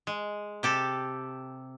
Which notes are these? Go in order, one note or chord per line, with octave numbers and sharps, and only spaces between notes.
G#3
C3 G4 A4